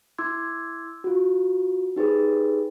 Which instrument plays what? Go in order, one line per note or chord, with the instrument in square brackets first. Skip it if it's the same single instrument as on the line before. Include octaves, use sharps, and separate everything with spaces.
[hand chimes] E4 C6 D6 E6 G#6
F4 F#4
D#4 G4 G#4 B4